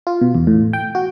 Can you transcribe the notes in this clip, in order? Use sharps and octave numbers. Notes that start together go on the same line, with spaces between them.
F4
B2
E2
A2
G5
F#4